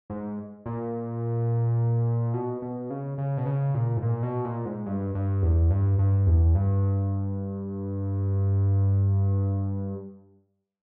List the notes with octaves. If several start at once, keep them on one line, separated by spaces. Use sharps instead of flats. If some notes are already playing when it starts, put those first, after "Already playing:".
G#2
A#2
B2
B2
C#3
C#3
B2
C#3
A#2
G#2
A#2
B2
A#2
G#2
G2
G2
E2
G2
G2
E2
G2